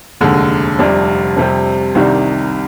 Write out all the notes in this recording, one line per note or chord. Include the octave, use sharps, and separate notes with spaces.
F1 D#2 D3 G#3
F1 F2 C3 G3 D4
F2 C3 G3 C4 G4
C2 C3 D#3 G3 D4